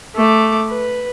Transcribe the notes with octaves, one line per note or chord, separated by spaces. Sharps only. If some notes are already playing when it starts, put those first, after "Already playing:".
A3 D6
B4